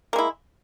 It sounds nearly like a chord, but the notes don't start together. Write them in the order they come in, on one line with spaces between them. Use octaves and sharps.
A#3 G#3 E4